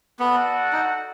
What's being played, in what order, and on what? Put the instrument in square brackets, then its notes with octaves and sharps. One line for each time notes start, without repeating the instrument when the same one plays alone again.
[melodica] B3 [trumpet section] F#4 A4 D5 F#5
[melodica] D#4